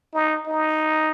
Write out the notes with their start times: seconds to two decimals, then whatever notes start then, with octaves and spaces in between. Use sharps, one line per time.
0.14 D#4
0.47 D#4